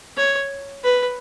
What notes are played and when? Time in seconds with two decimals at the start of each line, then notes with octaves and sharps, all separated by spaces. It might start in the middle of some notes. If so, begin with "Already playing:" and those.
0.17 C#5
0.83 B4